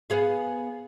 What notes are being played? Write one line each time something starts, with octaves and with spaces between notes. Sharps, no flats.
B3 G#4 F5